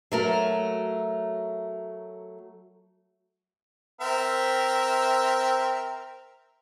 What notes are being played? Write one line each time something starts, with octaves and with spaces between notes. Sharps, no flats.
F#3 A3 A#4
C4 A#4 E5